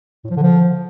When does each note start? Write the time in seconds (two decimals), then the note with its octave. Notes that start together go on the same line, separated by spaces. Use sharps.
0.24 A2
0.30 F3
0.37 D3
0.43 F3